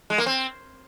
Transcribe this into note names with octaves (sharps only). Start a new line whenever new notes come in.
G#3
A#3
C4